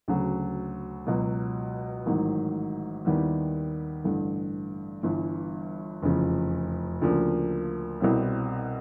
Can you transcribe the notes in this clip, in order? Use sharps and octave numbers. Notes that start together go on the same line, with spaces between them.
D2 C#3 F#3
C#2 B2 F#3
A1 G#2 D#3 F#3
D#2 D#3 G3 B3 E4
A1 G2 D3
G1 G2 E3
F1 E2 C#3 F3
D2 C#3 F3 A#3 D4
C2 B2 G3 C4 E4